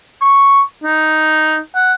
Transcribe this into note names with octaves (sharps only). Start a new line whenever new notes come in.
C#6
D#4
F#5